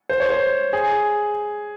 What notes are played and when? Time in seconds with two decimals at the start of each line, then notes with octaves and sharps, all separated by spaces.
0.09 C5
0.20 C#5
0.30 C5
0.73 G#4